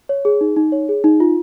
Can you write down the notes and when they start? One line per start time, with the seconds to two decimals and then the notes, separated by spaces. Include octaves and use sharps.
0.09 C#5
0.25 G#4
0.41 D#4
0.56 D#4
0.72 C#5
0.89 G#4
1.04 D#4
1.20 F4